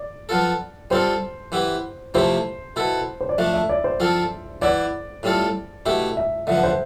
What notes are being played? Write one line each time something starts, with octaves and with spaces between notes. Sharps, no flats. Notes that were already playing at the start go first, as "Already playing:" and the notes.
Already playing: D5
F3 B3 F4 A4
G3 C4 F4 A4 C5
E3 B3 E4 G4
C3 F3 A3 E4 G4 C5
B2 B3 E4 A4
C5
D5
F3 A3 D4 E5
E5
D5
C5
F3 C4 F4 A4
E3 B3 E4 D5
A2 G3 C4 F4 A4
B2 A3 E4 G4 E5
E5
D3 F3 B3 E5
C5